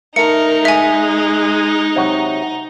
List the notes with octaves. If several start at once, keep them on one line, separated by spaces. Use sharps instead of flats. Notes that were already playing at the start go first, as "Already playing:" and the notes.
A3 D#4 A#4 C#7
G#3 E5 G#5
C3 F#3 F#4